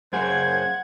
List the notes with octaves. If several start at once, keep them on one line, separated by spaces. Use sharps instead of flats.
F#2 G#4 C5 F#5 G#6